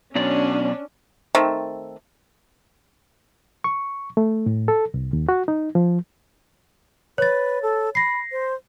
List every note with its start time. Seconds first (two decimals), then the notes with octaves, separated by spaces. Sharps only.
0.15 B2 F#3 C#4 D4 D5
1.35 D#3 A3 C4
3.64 C#6
4.17 A3
4.46 A2
4.68 A4
4.94 C2
5.13 D#2
5.29 F#4
5.48 D#4
5.75 F3
7.18 B4 C#5 A6
7.62 A4
7.95 B5 A#6 C7
8.32 C5